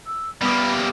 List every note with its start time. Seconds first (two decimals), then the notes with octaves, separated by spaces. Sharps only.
0.07 E6
0.42 G3 A#3 B3 B5 D#6